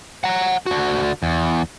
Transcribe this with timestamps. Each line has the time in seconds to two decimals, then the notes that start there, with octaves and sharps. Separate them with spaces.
0.24 F#5 A#5
0.66 D3 F#4
1.23 E2